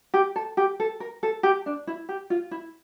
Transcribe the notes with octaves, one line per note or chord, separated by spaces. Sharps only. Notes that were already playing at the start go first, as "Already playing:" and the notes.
G4
A4
G4
A4
A#4
A4
G4
D4
E4
G4
F4
E4